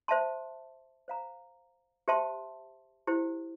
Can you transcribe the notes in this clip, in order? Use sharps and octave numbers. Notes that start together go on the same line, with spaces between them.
C5 E5 A5 C6
C5 F5 A#5
G4 C5 E5 A5 C6
E4 G4 C5